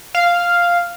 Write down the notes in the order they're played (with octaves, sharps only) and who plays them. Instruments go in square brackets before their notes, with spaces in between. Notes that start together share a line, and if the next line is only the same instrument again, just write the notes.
[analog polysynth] F5